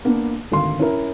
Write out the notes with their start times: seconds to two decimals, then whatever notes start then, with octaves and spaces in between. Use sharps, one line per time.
0.05 A#3 B3 D4
0.52 G#1 D2 F5 C6
0.79 C#4 E4 A#4